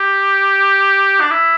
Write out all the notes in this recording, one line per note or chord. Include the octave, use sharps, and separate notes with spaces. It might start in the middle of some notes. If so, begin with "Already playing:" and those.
Already playing: G4
D4
E4